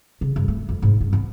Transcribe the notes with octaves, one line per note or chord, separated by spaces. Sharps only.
C#3
G2
A3
F2
G#2
G2
B3